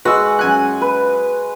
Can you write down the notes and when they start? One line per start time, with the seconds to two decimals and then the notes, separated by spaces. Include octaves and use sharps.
0.05 G#3 F#4 B4 E6
0.39 F#2 G#5 F#6
0.81 B4